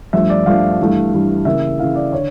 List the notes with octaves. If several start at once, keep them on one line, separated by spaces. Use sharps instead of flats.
G2 F3 A3 E5
D5
G2 F3 A3 F5
G2 E3 A3
G2 E3 A3
C#3 E3 A#3 E5
C#3 E3 A#3 F5
D5
D3 C#5